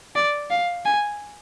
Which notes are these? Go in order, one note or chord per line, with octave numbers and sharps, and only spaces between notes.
D5
F5
G#5